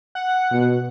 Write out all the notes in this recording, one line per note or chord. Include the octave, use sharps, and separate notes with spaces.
F#5
B2